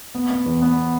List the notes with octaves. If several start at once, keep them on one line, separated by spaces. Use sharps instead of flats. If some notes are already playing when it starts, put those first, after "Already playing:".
B3
B3
E2
B3